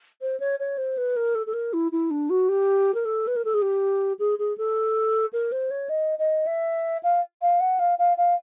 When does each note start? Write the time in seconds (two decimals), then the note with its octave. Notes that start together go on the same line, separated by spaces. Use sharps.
0.21 C5
0.40 C#5
0.59 C#5
0.77 C5
0.97 B4
1.16 A#4
1.35 A4
1.46 A4
1.53 A#4
1.73 E4
1.92 E4
2.10 D4
2.30 F#4
2.48 G4
2.94 A#4
3.05 A4
3.27 B4
3.36 A#4
3.44 A4
3.54 G#4
3.62 G4
4.19 G#4
4.38 G#4
4.57 A4
5.33 A#4
5.52 C5
5.70 C#5
5.89 D#5
6.18 D#5
6.46 E5
7.03 F5
7.42 F5
7.60 F#5
7.79 F5
7.98 F5
8.17 F5